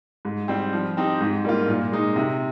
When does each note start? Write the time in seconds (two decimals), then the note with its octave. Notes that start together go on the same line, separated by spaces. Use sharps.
0.25 G#2
0.48 G3 C4
0.73 F3
0.97 C4 D#4 G4
1.21 G#2
1.45 G3 A#3 F4
1.68 A#2
1.92 G#3 D#4
2.16 C3